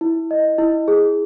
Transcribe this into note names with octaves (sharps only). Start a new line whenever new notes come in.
E4
D#5
E4
G#4